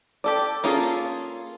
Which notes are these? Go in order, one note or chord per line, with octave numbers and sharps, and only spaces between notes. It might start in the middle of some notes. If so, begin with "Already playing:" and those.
G4 A4 D5
A#3 C#4 F4 G#4 A4